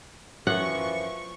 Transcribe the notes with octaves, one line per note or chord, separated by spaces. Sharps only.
F#2 E3 F3 F#5 C#6